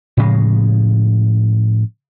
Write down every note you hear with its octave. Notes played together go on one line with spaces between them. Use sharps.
A2 C#3 F3 G#3